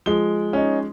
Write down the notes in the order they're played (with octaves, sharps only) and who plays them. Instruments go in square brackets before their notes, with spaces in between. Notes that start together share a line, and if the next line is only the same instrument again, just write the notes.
[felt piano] F3 G#3 [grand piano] G7
[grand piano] C#4 D#4